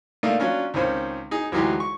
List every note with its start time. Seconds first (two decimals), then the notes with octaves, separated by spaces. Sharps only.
0.23 A3 A#3 D4 D#4 F4
0.40 F#3 C#4 D4 F4
0.74 C#2 D#3 C4 C#4 C5
1.31 D#4 G#4
1.52 D2 E3 F#3 G#3 D#4 G4
1.80 C#6